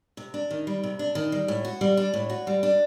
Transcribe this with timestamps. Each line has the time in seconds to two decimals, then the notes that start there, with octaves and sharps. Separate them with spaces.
0.17 C3
0.34 D4
0.51 D#3
0.67 G3
0.83 C3
0.99 D4
1.15 D#3
1.32 G3
1.48 A2
1.65 F#4
1.81 G3
1.97 D4
2.14 A2
2.29 F#4
2.47 G3
2.63 D4